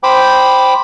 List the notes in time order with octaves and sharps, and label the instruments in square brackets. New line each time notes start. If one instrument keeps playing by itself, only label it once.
[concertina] C5 G5 B5 D6